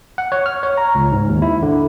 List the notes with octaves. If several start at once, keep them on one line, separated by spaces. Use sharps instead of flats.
F#5
C#5
F6
C#5
A#5
C#2
G#2
D#2
E4
D3